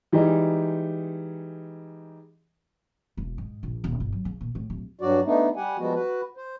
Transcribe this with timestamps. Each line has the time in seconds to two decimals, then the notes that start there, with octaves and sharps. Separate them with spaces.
0.12 E3 G3 G#3 D#4
3.17 E1
3.38 G#2
3.63 A#1
3.84 D#1
4.00 G1
4.12 F#3
4.25 C#3
4.41 A#2
4.55 A2
4.70 D1
5.01 G2 F#3 F#4 D5
5.25 A3 B3 D4 D#4
5.56 G3 G4 F#5 G#5
5.78 F3 G3 G#3 B3 F#4
5.94 F#4 B4
6.37 C5